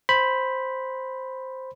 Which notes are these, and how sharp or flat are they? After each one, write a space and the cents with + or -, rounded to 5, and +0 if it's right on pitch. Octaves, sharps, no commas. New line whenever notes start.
C5 +0 B5 +0